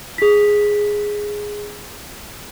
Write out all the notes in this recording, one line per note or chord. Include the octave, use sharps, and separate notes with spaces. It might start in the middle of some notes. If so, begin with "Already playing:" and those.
G#4 B6